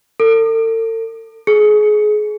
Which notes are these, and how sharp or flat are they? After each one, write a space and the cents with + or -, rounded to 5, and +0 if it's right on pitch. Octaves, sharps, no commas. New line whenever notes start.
A4 +40
G#4 +25